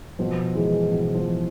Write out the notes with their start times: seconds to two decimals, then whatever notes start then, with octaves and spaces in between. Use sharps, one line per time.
0.19 B2 F3
0.55 E3 G#3
0.91 B2 E3
1.15 F3